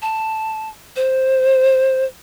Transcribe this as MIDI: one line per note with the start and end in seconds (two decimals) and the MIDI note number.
0.02 0.69 81
0.96 2.04 72